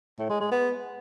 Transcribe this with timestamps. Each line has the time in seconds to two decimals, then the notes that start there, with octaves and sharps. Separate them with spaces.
0.18 A2
0.29 G#3
0.40 G#3
0.51 B3